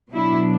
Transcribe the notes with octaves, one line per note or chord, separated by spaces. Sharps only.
B2 F#3 D4 E4